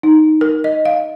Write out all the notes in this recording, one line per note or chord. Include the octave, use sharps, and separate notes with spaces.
D#4
A#4
D#5
F5